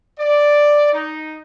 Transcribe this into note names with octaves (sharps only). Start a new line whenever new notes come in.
D5
D#4